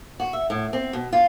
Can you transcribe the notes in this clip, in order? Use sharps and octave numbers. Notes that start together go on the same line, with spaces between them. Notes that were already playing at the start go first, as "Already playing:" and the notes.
F#4
E5
A2
C4
B2
F4